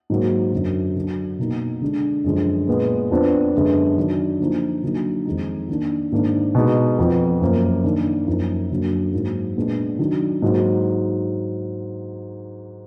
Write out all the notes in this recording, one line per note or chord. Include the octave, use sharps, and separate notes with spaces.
G#2 F#3 A#3
F#2 D3 F#3
D3 F#3 D4
B2 A#3 D#4
D3 G#3 D4
F#2 D3 F3 G#3 D4
A#2 G#3 B3
F2 F3 B3 D4
F#2 D3 G#3 B3
D#3 F#3 D4
D3 F3 A#3 D#4
D3 F#3 A#3 D#4
F2 D#3 G#3 D#4
D#3 A#3 D4
G#2 D#3 A#3 D4
B2 G#3 D#4
F2 F3 B3
F#2 F3 A#3
D#3 A#3 D4
F#2 F3 A#3 D#4
F#2 D3 F#3 A#3
G#2 F#3 A#3
A#2 G#3 B3 D4
D#3 F#3 D4
G#2 F#3 A#3